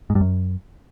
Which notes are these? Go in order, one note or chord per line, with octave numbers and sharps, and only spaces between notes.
G#2
G2
F#2